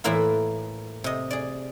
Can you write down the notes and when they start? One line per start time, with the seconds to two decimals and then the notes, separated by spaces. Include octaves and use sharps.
0.04 A2 E3 A#3 E4 F4
1.04 C3 D#5
1.30 G#4 D5